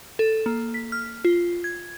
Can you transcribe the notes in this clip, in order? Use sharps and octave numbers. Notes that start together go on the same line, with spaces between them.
A4
A#3
B6
F6
F4
G#6